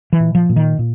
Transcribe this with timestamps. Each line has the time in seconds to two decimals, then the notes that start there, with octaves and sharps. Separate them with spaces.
0.13 E3
0.20 A#2
0.35 F3
0.49 A#2
0.56 D#3
0.79 A#2